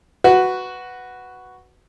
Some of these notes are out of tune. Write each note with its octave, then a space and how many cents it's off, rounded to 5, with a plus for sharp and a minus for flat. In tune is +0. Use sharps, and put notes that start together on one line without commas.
F#4 +0 B4 +5